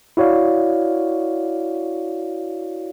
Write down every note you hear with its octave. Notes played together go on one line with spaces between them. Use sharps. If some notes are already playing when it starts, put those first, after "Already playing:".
E4 F#4 C#5 D5 F5